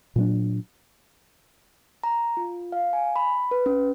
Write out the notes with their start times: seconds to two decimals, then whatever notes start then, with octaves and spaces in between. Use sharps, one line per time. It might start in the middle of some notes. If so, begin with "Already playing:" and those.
0.16 A#2 F#3 D4
2.04 A#5
2.37 F4
2.72 F5
2.93 G#5
3.16 B5
3.51 B4
3.66 C#4